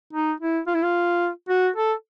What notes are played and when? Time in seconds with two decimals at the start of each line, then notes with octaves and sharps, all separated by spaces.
0.13 D#4
0.40 E4
0.67 F4
0.75 E4
0.83 F4
1.49 F#4
1.76 A4